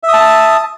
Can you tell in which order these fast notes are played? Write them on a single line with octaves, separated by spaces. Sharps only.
E5 D#6 A5